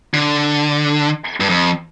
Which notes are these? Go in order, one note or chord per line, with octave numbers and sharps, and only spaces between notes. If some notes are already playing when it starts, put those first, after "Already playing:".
D3
G2
F2